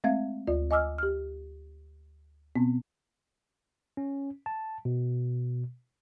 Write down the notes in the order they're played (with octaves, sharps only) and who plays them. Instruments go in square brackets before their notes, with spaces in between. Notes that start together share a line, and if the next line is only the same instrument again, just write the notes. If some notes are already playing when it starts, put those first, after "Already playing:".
[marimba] G#3 A3 C4 E5 F5 G#6
D2 F4 D5
D#5 G#5 D6 E6 F6
G4 F6
B2 B3 C4
[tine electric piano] C#4
A5
B2